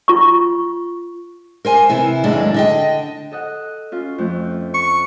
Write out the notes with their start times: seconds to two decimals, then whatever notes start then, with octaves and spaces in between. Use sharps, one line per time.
0.08 F4 C#6
1.65 A#4 C5 G#5
1.89 C3 E3 E4
2.23 D#2 A2 F#3 G#3 D4
2.54 D3 D#5 G5
3.31 A4 D#5 F#5
3.92 C#4 F4
4.18 F2 A3
4.74 C#6